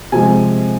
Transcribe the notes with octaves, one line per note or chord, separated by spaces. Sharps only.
C3 F3 G#3 G#5